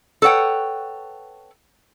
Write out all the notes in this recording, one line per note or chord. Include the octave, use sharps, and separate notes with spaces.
A4 B4 C#5 F#5 G5